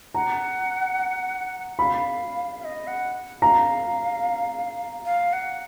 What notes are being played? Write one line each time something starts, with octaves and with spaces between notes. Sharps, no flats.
F#5 A#5
F5 B5
F5
D#5
F#5
F5 A#5
F5
F#5